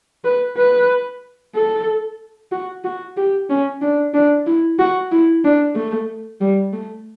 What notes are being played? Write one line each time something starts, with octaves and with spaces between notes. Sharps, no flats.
B4
B4
A4
F#4
F#4
G4
C#4
D4
D4
E4
F#4
E4
D4
A3
G3
A3